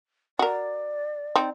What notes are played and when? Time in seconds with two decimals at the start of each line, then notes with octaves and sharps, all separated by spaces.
0.39 F#4 A#4 D5
1.36 C4 D#4